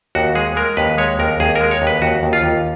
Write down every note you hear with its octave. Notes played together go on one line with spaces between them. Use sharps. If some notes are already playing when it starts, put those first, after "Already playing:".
D#2 F#4
G#3 G#4
G#3 A#4
D#2 B4
G#3 C#5
D#2 A#4
D#2 G#4
A#4
G#3
C#5
D#2
B4
D#2 F#4
D#2
F4
D#2